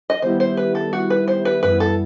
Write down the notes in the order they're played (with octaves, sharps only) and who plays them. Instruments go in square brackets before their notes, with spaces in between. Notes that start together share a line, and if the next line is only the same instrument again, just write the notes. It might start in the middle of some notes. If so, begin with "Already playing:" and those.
[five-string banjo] D#5
[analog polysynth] D#3 G3 B3 E4 G4 [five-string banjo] C5
[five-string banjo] C5
B4
A4
F#4
B4
C5
B4
[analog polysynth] F#2 E3 G3 B3 E4 [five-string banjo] B4
[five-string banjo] A4